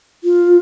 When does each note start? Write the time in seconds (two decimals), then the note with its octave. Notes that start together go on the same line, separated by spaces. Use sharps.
0.24 F4